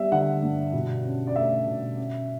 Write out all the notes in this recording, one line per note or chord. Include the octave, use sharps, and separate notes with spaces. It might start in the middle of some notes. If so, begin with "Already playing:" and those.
Already playing: G3 B3 E5
D3 F#5
G2
B2
C#4
D5
A3 E5
B2
C#4